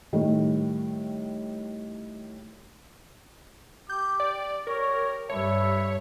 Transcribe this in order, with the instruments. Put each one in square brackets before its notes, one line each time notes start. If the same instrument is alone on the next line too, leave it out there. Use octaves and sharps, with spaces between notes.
[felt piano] A2 D#3 G3
[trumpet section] G4 D6 [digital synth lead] G6
[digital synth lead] D5
[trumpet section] G4 C#5 [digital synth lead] A#4
[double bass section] G2 G3 [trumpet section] A4 B4 E5 [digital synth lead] C#5